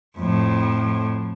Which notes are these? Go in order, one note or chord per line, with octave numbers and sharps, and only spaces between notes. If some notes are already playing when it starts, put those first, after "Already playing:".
F2 A2